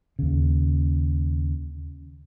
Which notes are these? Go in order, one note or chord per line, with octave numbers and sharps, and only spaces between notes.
D#2 C#3